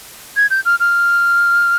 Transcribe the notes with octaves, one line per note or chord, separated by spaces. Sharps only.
G#6
G6
F6
F6